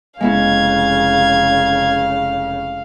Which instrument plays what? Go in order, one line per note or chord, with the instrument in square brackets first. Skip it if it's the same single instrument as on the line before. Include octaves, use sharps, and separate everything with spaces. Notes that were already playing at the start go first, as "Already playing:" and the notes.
[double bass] F1 C#3 [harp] G#3 B3 E4 [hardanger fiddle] F5 [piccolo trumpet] G#6